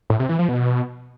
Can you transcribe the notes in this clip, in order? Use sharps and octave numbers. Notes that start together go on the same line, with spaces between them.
A2
C3
E3
F3
B2